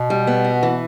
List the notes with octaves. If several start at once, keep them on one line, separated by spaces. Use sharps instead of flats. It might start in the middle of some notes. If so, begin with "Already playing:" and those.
Already playing: B2
G3
B3
F#4
E3